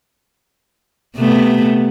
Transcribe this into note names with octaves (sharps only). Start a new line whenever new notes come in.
C3 A3 B3